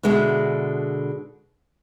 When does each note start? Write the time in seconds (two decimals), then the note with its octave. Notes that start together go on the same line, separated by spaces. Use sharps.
0.03 B2 D3 G#3 D4 E5